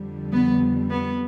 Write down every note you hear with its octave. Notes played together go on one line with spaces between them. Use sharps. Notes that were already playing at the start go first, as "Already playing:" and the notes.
Already playing: F2 D3 G3
B3
B3